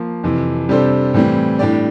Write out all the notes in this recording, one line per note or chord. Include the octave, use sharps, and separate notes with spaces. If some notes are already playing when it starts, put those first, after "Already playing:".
Already playing: F3 A#3
F2 C3 E3
C3 G3 D4 A4 C5
A2 E3 G3 C4
A2 G3 D4 G4 D5